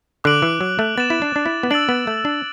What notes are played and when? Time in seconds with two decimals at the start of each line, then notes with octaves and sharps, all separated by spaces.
0.24 D3 D6 F#6 D7 F#7
0.42 E3
0.61 F#3
0.79 A3
0.98 B3 A6 E7
1.10 E4
1.22 D4
1.36 D4
1.46 E4
1.63 B3
1.70 D4 E6 A6 D7 F#7
1.89 B3
2.07 A3
2.25 D4